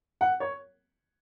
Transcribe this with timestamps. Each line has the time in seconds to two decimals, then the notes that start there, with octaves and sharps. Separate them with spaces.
0.21 F#5
0.40 C#5